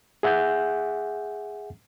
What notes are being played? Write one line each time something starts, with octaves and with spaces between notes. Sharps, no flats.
G#4 E5 F#5 G#5 G6